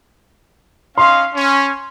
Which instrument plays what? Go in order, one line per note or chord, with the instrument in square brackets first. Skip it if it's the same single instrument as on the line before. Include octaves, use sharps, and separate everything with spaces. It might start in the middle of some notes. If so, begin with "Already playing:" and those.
[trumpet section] C#4 D#5 F5 [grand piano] C6
[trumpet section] C#4